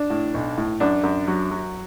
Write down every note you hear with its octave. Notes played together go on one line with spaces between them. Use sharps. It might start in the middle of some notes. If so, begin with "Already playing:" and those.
Already playing: D4
A2
B1
A2
F#2 D4
F#2
F#3
F#3